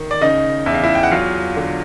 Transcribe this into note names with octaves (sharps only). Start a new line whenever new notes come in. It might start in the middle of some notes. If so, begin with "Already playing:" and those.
Already playing: D#3
D5
C#3 D#4 D#5
E2 E5
F5
E4 E5
G5
F#5
F#3 F4 F5
D3